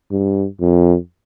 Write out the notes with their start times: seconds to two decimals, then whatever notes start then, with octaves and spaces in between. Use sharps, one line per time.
0.11 G2
0.60 F2